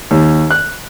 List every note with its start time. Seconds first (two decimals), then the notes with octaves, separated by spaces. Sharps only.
0.11 D#2
0.51 F#6